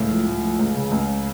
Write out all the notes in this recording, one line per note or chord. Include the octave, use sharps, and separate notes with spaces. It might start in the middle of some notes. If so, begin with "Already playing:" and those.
Already playing: C#2 A2
F3
A2
F3
C#2
C#3
C#2